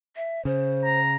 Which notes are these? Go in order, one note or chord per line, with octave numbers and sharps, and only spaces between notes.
E5
C#3 C5
A#5